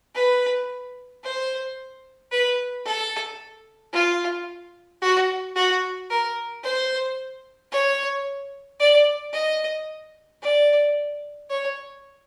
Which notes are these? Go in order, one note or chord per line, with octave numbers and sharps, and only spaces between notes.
B4
C5
B4
A4
F4
F#4
F#4
A#4
C5
C#5
D5
D#5
D5
C#5